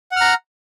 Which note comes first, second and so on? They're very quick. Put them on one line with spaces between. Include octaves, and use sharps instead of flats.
F#5 F6 A#5